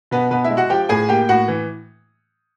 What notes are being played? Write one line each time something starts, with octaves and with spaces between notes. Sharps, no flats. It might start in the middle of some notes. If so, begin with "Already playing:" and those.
B2 B3 B4
B2 B3 B4
E4 E5
G#3
F#4 F#5
F3 G4 G5
A2 G#4 G#5
A#3 G4 G5
A2 F#4 F#5
E3